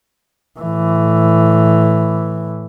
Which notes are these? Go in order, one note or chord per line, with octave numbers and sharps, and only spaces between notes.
A2 E3